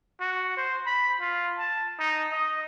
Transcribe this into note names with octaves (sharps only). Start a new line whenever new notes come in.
F#4
C5
B5
F4
A5
D#4
D#5